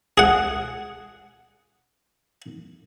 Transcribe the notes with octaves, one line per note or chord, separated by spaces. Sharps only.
G#4 F#5